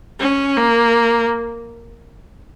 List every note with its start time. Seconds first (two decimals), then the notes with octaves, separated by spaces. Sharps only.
0.19 C#4
0.57 A#3